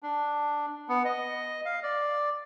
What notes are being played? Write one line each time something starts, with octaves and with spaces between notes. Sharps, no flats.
D4
B3
D#5
F5
D5